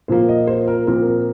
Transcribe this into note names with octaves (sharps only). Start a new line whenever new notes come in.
A#2 F3 A#3 C5
D#5
C5
A#4
A#2 F3 C4 A#4
A#4